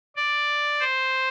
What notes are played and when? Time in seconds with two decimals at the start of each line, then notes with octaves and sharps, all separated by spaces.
0.16 D5
0.80 C5